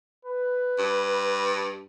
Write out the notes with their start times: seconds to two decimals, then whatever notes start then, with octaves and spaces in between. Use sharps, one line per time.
0.25 B4
0.78 G2